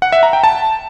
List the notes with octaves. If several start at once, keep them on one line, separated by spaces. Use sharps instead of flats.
F#5
E5
A#5
G5
A5